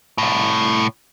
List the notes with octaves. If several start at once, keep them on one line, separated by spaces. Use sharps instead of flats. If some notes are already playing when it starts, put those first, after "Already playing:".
C2 A2